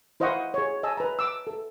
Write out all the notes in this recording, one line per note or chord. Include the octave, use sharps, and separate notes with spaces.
E4 C5 D#5 F5 F#5 C#6
G#4 C#5
D#5 G#5 A5 E6
B4 A#5
D6 E6
A4